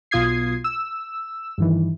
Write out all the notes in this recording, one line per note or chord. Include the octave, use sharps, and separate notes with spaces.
B1 B2 F4 D#6 G#6 C7
E6
G2 D#3 E3